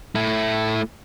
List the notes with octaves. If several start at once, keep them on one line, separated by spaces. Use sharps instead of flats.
A3 E4